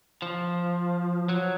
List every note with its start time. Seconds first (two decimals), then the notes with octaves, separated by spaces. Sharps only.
0.22 F3
1.29 F#3